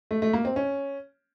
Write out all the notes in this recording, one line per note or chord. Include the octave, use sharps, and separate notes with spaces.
A3
A3
A#3
C4
C#4